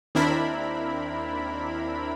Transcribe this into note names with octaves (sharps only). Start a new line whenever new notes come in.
D#2 C4 D4 E4 A#4 B5